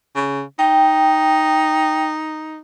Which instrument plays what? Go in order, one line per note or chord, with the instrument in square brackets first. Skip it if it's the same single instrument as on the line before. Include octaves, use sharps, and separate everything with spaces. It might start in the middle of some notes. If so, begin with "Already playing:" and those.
[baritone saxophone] C#3
[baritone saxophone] D#4 [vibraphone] G5